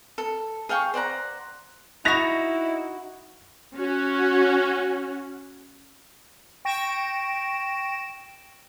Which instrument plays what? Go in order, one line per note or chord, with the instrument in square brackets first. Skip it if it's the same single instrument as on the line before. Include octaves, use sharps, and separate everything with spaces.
[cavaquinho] A4
G#4 F5 G5 C#6
C5 D5 F#5 A#5
[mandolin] D#4 F#4 [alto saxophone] E4 [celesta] B5 C#6 F#6 [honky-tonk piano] A#6 F7
[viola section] C#4 F#4
[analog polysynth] G5 C#6 A#6 D7 E7